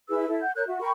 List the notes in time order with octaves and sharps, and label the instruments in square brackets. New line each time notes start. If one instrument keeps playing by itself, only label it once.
[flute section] E4 G#4 B4 E6
E4 A4
F#5 G6
A#4 C#5 F#6 G6
F#4 E5
A#4 G5 B5 C#6